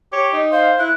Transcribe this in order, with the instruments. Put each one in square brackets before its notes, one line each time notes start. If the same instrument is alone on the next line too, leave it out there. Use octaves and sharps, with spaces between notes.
[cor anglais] G4 [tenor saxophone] C#5
[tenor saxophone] D#4
[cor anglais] C5 [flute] F5
[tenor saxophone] E4 [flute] F#6